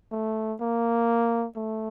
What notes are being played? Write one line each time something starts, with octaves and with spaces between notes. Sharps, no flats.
A3
A#3
A3